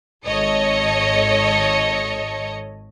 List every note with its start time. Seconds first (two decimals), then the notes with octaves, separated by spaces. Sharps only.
0.25 G#1 A4 C#5 D#5 C#7